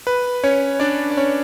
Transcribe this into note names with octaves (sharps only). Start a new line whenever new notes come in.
B4
C#4 C#5
D4 D5
D5
C#4 C#5